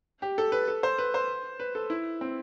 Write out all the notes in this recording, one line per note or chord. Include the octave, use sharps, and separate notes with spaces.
G4
A4
B4
A4
C5
B4
C5
B4
A4
E4
C4